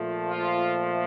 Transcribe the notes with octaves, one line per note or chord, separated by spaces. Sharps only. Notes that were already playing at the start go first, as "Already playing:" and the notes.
Already playing: A#2 F3 A3
F4